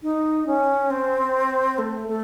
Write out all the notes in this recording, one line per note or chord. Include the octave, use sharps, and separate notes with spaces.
D#4
C#4
C4
A3
A3